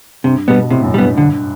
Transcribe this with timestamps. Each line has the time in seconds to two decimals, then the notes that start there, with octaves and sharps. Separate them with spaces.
0.24 G2 C3
0.48 B2 G3 B3
0.70 A2 C3
0.83 F#2
0.94 G2 G3 B3
1.18 G2 D3